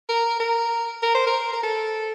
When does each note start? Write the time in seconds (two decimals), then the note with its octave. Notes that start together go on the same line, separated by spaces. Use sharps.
0.09 A#4
0.40 A#4
1.02 A#4
1.15 C5
1.27 A#4
1.53 A#4
1.63 A4